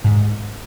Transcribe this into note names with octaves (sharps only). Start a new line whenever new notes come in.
G#2